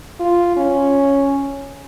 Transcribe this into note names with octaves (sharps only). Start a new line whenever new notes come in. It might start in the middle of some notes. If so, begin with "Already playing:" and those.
F4
C#4